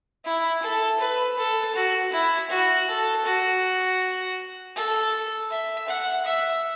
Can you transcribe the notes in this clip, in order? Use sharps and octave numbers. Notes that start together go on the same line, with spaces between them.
E4
A4
B4
A4
F#4
E4
F#4
A4
F#4
A4
E5
F#5
E5